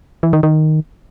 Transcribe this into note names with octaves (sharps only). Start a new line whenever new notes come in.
E3
D#3
D#3